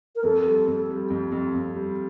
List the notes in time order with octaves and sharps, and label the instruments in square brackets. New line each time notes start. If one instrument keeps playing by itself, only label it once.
[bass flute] A#4
[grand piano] F2 [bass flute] A4
[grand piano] G3
F2
G3
F2
F2
F2
G3